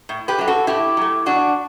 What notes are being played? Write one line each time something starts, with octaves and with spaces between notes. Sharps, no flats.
A2
G4 B4
F#3 A3
F#4 A4
A2 E4 G4
F#3 A3
E2 D4 F#4